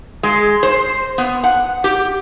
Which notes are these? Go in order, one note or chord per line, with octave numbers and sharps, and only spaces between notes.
G#3
C5
B3
F#5
G4